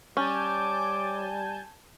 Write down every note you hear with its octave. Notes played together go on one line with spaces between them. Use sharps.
G3 C#4 G#5 A5 D6 G6